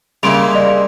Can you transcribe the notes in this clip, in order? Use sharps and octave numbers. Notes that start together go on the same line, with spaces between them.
C#3 G3 G#3 A#3 E4 C6 D7 F7
D5 D#5